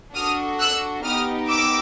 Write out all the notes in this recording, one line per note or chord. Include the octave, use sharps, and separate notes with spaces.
D4 F#4 A4 D#6 F6
E6 F#6
B3 D#4 G4 D#6 F6
D6 E6